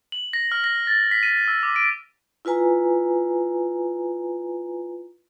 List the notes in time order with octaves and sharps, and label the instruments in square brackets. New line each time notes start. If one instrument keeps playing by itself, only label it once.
[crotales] F#7
A#6
F6
A#6
A6
B6
D#7
E6
D6
D7
[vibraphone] E4 F4 B4 G#5 A#5